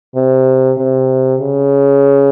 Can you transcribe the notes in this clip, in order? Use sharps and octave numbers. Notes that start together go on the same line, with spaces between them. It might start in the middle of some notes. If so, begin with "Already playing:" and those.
C3
C3
C#3